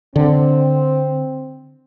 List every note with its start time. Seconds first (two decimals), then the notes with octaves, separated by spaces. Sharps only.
0.16 D3 C4